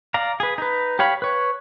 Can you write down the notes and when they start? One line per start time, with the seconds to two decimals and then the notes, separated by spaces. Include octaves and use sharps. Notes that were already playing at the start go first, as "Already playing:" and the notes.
0.14 D5 F5 A#5
0.40 G#4 B4
0.58 D#4 B4
0.99 G4 C#5 F5 B5
1.22 B4 C#5